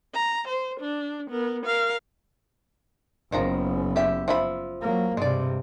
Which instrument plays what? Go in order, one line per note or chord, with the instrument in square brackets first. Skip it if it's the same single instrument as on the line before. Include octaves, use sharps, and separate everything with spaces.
[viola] A#5
C5
D4
B3 A#4
A#4 F5
[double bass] F#1 B3 [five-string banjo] D#3 F3 A#5
[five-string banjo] G4 E5
F3 E5 B5
[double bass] F#3 A#3
[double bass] G2 C3 [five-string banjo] G#3 D5